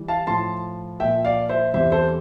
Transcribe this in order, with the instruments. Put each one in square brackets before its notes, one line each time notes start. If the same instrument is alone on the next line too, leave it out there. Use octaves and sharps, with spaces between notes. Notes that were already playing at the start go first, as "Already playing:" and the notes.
Already playing: [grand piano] E3 G3
F5 A5
A2 F3 A5 C6
A#2 F3 E5 G5
D5 F5
C5 E5
E2 C3 G3 C5 E5
A4 C5